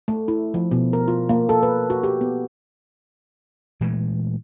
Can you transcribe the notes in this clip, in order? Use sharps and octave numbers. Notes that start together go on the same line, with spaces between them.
A3
E4
F3
B2
A#4
F4
A#3
A4
B4
F#4
G4
B3
A#2 E3 G#3 A3